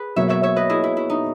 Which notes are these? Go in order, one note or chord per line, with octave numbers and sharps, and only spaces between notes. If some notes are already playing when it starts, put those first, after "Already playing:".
Already playing: G#4 B4
B2 F#3 A#3 C#5 E5
C#5 E5
C#5 E5
B4 D#5
E4 G#4
E4
E4
D#4